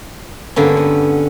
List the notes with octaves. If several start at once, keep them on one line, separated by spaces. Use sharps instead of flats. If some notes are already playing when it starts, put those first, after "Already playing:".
G2 D3 A#3 B3 C#4
B3